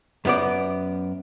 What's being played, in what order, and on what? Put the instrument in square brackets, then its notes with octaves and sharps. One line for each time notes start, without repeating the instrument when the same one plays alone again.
[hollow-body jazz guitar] F#2 B3 D5